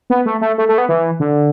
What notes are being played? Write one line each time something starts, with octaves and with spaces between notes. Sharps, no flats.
B3
A3
A3
A3
A3
B3
E3
D3